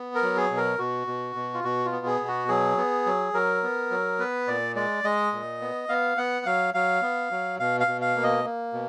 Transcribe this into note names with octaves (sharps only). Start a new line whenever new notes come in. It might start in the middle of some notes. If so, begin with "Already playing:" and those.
Already playing: B3
A#4
F#3
G#4
B2
A#4
B2 F#4
B2
B2
F4
B2 F#4
F4
B3
G#4
B2
F#4
F#3 G#4
B3
F#3
F#3 A#4
B3
F#3
B3 B4
A#2 D5
G#3 D5
G#3 D#5
A#2
B3
B3 F5
B3 F#5
F#3 F5
F#3 F5
B3
F#3
B2 F5
F5
B2
F5
A#3
D#5
A#3
B2